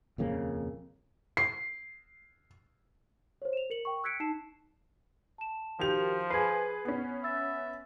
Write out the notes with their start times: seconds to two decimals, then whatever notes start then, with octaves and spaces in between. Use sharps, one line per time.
0.18 D#1 F2 C#3 A#3
1.37 C7
3.42 C5 C#5
3.53 E7 F7
3.70 A#4 C#7 F#7
3.85 G5 C#6
4.04 E6 F#6 G#6 B6 C#7 D7
4.20 D#4 A5 C7 E7
5.38 A5 E7
5.79 D#3 F3 F#4 G4 A#4 G6 F7
6.30 G#4 B4 G#6 C7
6.85 B3 C#4
7.24 E5 E6 A6